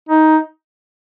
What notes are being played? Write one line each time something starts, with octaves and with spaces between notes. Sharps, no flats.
D#4